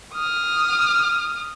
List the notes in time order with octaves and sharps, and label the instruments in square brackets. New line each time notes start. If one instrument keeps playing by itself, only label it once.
[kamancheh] D#6 F6